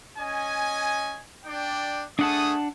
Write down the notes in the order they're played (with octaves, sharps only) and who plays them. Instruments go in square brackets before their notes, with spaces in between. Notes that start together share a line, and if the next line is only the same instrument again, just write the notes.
[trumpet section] C#4 D#5 G#5
D4 D5 G5
[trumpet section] A3 G#4 D#6 [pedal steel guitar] D4 F#5 A5